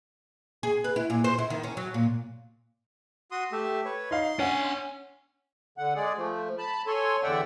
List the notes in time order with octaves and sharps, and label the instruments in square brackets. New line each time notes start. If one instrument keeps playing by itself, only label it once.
[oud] G#4
B4
E4
A#2
C5
E4
D#3
C#4
F#3
A#2
[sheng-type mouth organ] F#4 C6 D#6
A3 G4 E5
B4 C#5
[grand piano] D#4 F5 [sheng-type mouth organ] C6
[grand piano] C#4 F#5 [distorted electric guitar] D4 G#5
[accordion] D3 F#5
G#3 G#4 D5
F3 A3
A5 B5
A4 C#5 G#5 C6
E2 D3 D5 E5 F#5 G5